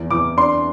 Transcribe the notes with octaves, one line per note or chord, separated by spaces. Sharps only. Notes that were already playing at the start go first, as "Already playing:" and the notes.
Already playing: E2
E2 D6
D4 C6